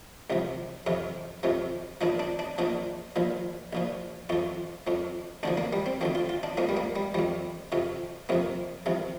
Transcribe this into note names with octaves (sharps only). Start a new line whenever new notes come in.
C2 C3 F3
F2 C3 F3
F2 C3 F3
A#1 A#2 F3 D4
D4
D4
A#1 A#2 F3 D4
A#1 A#2 F3
A#1 A#2 F3
F2 F3 F4
F2 F3
D2 D3 F3 D4
A#3
G3
C4
D2 D3 F3 C4
F4
F4
D4
F2 F3 A#3
G3
A#3
G3
F2 F3 G3
F2 C3 F3
F2 C3 F3 A#3
C2 C3 F3